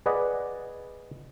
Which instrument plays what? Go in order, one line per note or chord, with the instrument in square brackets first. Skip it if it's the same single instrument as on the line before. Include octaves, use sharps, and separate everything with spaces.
[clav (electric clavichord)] G#4 B4 D5 D#5 F#5